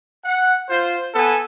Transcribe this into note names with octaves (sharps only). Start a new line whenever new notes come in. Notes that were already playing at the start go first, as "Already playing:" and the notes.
F#5
F4 C5
B3 A4 G#5